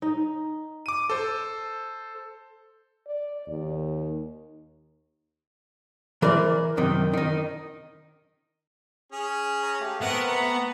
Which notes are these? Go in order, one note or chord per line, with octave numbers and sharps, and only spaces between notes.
D#4
D6 D#7
A4 C5
D5
D#2
E3 A#4 C5 D5
F#2 C3 D#3
D#3 D#4
C#4 G#4
C#5 G#5 A#5
A3 G4 F5
A3 B3 C4 A#4 F#5 C#6
A#5
A5